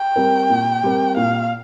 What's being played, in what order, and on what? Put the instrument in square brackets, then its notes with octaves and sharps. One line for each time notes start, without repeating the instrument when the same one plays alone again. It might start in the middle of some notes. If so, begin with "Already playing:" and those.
Already playing: [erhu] G5
[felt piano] G3 C4 A#4
A#2
G3 C4 A#4
[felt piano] A#2 [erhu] F5